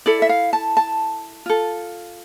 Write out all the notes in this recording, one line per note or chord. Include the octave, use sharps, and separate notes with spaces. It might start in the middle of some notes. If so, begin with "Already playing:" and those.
E4 A4 D5
E5
F5
A5
A5
F4 A4